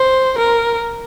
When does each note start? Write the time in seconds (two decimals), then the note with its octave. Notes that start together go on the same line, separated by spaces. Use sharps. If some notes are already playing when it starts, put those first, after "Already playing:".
Already playing: C5
0.38 A#4